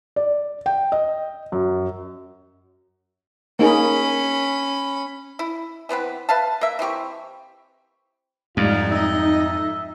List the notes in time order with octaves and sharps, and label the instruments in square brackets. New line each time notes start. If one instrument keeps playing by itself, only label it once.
[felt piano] D5
G5
D#5
F#2
[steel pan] A#3 D#4 G#4 [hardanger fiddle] C#4 B5
[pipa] E4
E3 B3 C4 B4
B4 E5 F5 A5
A#3 E5
E3 C4 G4 C#6
[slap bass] F2 [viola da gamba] G#2 G3 [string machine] D#4 [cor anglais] F4
[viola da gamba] D#5 [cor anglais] E5